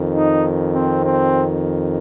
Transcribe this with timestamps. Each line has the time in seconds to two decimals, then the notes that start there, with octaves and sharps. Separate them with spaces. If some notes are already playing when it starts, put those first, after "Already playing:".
Already playing: F2 D#3
0.15 D#4
0.74 C4
1.04 C4